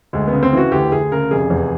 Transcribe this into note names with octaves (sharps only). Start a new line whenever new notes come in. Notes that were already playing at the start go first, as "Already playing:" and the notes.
D2 G#3
C#3 B3
C4
E3 F#4
D2 G4
D2 G#4
C#3 A#4
F1 G#4
E2